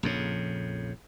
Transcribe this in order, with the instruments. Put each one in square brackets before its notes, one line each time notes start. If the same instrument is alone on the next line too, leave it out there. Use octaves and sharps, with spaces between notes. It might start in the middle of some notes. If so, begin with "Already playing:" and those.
[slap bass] A#1 F2 C#3